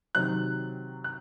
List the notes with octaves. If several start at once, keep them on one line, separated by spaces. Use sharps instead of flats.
C3 D#3 F#3 F#6
F#6